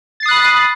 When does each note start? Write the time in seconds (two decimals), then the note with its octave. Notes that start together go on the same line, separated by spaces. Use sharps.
0.20 A6
0.23 C7
0.26 D#6
0.28 F#6
0.31 B5